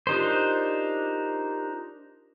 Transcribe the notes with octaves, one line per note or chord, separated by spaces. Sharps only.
D4 D#4 F4 G4 A#4 C5